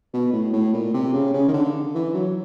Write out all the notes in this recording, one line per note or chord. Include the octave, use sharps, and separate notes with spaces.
B2
A2
A2
A#2
C3
C#3
C#3
D#3
D3
E3
F#3